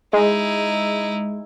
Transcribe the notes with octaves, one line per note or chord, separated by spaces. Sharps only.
G#3 D#4 E4